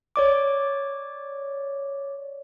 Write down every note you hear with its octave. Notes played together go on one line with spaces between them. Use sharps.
C#5 D5 D6